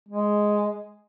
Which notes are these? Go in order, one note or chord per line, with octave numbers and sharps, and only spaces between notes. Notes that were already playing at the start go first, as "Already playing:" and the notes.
G#3